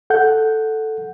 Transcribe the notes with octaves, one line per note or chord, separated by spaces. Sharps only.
A4 F#5 G6